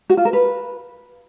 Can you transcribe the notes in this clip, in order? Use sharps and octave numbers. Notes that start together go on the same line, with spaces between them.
F#4
F4
A#4
B4